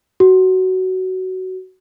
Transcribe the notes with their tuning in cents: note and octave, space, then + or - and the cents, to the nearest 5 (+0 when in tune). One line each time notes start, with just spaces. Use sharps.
F#4 +15